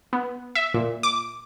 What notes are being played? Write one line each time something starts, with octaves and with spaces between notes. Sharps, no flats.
B3
E5
A#2
D6